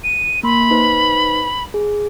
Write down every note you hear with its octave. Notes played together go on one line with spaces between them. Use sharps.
D#7
A#3 B5 C6
D#4 B4 C5
G#4